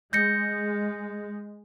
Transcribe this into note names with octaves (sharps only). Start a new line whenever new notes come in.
G#3 G6 A#6 C#7